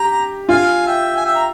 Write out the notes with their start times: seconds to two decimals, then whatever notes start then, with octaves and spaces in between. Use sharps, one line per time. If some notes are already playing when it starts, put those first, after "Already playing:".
Already playing: G4 G5 A#5
0.49 F4 F5 G#5
0.87 E5 G5
1.16 G#5
1.25 E5 G5
1.35 A#5